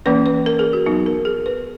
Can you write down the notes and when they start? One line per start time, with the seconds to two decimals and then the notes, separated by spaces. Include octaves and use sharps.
0.06 E3 A#3 C#4 B4
0.26 B4
0.46 A#4
0.59 G#4
0.73 F#4
0.86 F#3 B3 D#4
1.06 A#4
1.25 G#4
1.46 B4